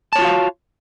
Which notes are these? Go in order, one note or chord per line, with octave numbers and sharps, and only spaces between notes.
F4 F#4 C#5 F5 A5